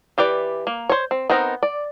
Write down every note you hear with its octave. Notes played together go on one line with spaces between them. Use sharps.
E3 G4 B4 D5
A#3
C5 C#5
C4
B3 C4 D#4 A#4
D5